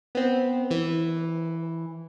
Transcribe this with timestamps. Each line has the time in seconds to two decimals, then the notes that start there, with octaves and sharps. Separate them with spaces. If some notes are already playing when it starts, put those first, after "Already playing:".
0.15 B3 C4
0.71 E3